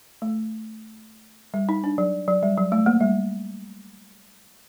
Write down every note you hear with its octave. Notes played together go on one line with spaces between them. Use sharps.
A3
G3
D#4
D4
F#3
F#3
G3
F#3
A3
A#3
G3